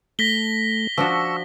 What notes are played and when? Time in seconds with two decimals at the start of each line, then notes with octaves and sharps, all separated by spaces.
0.19 A3 A#6 B6 G7
0.97 F3 D4 F#4 C#6 E6